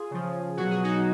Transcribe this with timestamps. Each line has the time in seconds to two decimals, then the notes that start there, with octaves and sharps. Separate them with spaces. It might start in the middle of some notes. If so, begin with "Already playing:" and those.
Already playing: F4 G#4
0.11 C#3 F3
0.57 B2 F#3 F#4
0.70 G#4
0.84 D#4 F#4